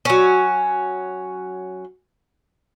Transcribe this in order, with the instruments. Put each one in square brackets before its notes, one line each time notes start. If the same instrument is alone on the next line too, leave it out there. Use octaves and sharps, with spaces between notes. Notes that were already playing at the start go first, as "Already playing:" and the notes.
[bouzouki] F#3 C#4